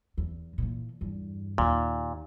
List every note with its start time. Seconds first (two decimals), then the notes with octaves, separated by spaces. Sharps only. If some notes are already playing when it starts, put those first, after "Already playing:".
0.18 E2
0.58 A#2 E3
1.01 E2 G2
1.58 D#2 A#2